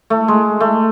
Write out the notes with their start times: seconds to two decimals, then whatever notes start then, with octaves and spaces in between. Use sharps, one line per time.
0.10 A3
0.28 G#3
0.60 A3